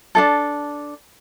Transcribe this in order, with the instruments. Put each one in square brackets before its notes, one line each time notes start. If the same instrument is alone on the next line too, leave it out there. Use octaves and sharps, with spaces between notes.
[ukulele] D4 D#4 A4